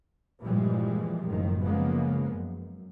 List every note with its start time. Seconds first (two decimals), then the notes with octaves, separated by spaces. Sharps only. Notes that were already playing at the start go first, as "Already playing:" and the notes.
0.42 G2 A#2 E3 F3 G3 G#3
1.27 F#1 A2 D#3 F3
1.62 C#3 F3 G#3 A#3 B3
2.34 F#2